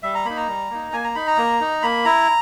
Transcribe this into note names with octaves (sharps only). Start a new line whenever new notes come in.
G3 E5
A#5
A#3 D#4 B5
A#5
G3
A#3 D#4
A#3 G#5
A#5
D#4 B5
A#5
A#3
D#4
A#3 B5
E4 A#5